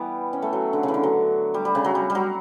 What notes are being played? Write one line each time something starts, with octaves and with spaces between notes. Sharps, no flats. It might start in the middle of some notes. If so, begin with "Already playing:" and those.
Already playing: E3 G3 B3
C#4
A3
F#3
D3
C#3
E3
D3
F#3
G3
G3
C#3
F#3
G3
G3
F#3